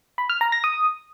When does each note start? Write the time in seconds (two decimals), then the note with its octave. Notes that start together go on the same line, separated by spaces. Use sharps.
0.18 B5
0.29 F6
0.41 A#5
0.52 A#6
0.64 D#6